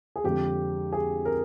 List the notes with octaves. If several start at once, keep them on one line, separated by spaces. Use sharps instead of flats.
G#4
F2 D3 F3 G#3 C4 G4
G#4
A#4